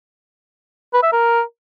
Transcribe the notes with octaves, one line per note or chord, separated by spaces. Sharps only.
B4
E5
A#4